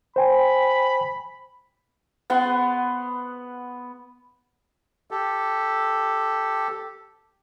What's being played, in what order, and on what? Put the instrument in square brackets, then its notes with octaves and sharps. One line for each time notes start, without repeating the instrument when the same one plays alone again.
[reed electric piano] C5 G5 G#5 [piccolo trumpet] B5
[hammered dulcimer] B3 F#5 C6
[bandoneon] G4 A4